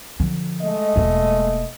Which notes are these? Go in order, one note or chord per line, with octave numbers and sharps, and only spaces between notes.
D3 F3
G#3 A3 D#5
E1 A#3